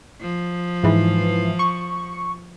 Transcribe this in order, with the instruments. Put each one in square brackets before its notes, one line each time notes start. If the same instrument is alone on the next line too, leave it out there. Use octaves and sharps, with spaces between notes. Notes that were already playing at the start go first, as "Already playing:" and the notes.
[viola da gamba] F3
[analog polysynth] G#2 E3
C#6